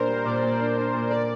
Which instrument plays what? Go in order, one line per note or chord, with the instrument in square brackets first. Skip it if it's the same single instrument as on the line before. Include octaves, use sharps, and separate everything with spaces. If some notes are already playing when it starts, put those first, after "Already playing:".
Already playing: [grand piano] A#2 D4 [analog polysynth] A#4 C5
[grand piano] G3
[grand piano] A#2 [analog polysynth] D5
[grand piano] A#2 [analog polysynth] D5
[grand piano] D4
[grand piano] D4 [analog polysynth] D5
[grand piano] A#2
[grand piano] A#4 [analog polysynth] D5